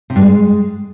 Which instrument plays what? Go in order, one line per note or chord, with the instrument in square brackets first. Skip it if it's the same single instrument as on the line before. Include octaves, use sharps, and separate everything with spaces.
[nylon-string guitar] C3
G2
G#3